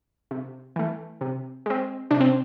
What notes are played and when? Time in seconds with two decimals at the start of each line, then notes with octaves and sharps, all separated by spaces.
0.31 C3
0.76 E3 A3
1.21 C3
1.66 G#3 C4
2.11 C3 D4
2.21 C4